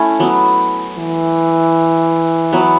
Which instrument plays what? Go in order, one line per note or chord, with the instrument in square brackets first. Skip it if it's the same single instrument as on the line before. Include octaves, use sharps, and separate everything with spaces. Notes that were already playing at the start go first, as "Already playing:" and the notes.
Already playing: [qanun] A3 C#4 E4
F#3 B3
[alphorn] E3
[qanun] F#3 B3